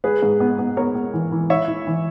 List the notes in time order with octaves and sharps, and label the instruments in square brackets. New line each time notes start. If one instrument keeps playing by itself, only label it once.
[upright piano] G#3 [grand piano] G#4 B4
[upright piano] G#2
B3
B3
[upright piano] B3 [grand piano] A#4 C#5
[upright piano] B3
E3
E3
[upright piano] E4 [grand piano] C#5 E5
[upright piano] E4
E3